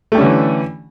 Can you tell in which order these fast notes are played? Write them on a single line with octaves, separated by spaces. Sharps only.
A3 G3 C#4 D3 E3